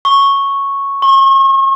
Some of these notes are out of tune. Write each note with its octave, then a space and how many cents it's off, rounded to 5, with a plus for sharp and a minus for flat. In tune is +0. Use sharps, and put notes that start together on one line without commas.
C#6 -5
C#6 -40